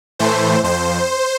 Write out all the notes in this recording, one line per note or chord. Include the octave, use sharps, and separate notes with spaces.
A2 E3 A3 C5
F2 C5